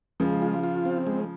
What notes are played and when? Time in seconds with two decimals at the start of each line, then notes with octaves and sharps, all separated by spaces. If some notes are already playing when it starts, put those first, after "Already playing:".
0.20 C#3 F3 G#3
0.42 F4
0.63 F4
0.85 C4
1.07 G#3